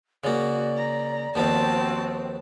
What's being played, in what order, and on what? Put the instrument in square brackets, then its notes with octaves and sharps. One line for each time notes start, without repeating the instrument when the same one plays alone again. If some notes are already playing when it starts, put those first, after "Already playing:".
[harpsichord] C#3 A#3 [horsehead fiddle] F#4 [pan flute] D5
[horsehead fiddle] A#5
[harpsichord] D#2 F3 B3 [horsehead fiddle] C4 F#4 [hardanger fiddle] A5